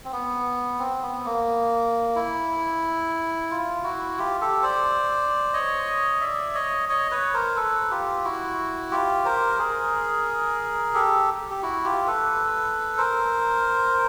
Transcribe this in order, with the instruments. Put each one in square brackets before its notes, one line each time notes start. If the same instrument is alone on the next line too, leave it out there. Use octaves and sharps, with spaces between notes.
[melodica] C4
B3
C4
B3
A#3
E4
F4
E4 F#4
F4 G4
G4 A4
C5 D5
C#5 D#5
D5 E5
C#5 D#5
C#5 D#5
B4 C#5
A#4 C5
A4 B4
F4 G4
E4 F#4
F4 G4
A#4 C5
G#4 A#4
G4 A4
G4
E4 F#4
F4 G4
A4 B4
A#4 C5